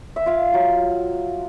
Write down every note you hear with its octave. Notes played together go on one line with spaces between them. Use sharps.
E5
F4 F5
F#3